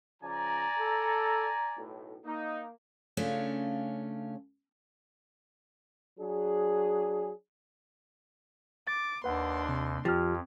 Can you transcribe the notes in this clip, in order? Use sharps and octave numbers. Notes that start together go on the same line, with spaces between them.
C#3 F3 D5 G#5 A#5
A4
B1 A2
A#3 D#4
C#3 A3 C#4 D4 F4
F#3 D4 G#4
D6 A6
D#2 D4 B4 F#5 C6
C3
F2 F3 G4 F6